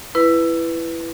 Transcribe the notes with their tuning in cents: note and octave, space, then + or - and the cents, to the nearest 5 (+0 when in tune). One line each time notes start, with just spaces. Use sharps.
E4 +15 B4 +0